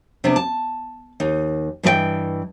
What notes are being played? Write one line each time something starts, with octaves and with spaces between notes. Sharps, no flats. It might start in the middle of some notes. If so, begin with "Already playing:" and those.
C3 B3 D4
A5
D#2 D#4
G2 E3 G4 B4 D#5 G5